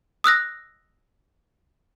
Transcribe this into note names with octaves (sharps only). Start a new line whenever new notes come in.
D#6 E6 F#6 A#6